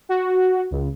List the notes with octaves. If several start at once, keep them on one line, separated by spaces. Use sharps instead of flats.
F#4
C#2